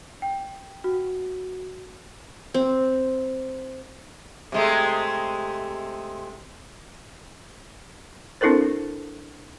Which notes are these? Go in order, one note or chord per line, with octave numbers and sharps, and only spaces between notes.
G5
F#4
C4
C3 G#3 A3
C4 D4 E4 A4 A#4 C5